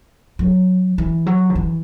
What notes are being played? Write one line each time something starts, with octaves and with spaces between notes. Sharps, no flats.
F#3
E3
F#3
D3
E3